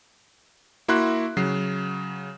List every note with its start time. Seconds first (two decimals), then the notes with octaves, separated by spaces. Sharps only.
0.88 A#3 E4 F#4 C6 F#6
1.37 C#3 F#3 C7